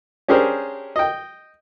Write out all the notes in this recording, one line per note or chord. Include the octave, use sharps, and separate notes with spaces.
C#4 D4 G4 G#4 A#4 C5
D#5 G5